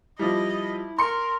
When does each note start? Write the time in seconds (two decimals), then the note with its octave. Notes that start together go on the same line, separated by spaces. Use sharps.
0.19 F3 G3 E4 D#5
0.98 A#4 C6 C#7